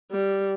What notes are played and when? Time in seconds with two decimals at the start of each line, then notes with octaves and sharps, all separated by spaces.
0.12 G3